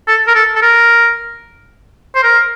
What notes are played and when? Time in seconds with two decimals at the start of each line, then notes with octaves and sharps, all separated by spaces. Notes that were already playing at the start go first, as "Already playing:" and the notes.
0.08 A4
0.28 A#4
0.36 A4
0.56 A4
0.62 A#4
2.15 C5
2.23 A#4